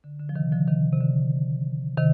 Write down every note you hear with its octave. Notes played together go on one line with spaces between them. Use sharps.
D3
D3
F3
C3 D#3
D3 F3
C3 D#3
C3
D3
C3 D#3